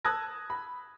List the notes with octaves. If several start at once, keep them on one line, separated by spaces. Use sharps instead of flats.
A5 D#6 E6 F#6 G#6 A#6
B5